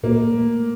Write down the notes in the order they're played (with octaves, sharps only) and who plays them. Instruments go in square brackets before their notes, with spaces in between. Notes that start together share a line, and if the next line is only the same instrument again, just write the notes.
[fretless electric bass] A#2 [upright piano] A#3
[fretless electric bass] A3